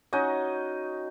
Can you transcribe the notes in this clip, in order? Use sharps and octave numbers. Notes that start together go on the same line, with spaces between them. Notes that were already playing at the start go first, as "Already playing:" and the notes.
C#4 D#4 F#4 D#5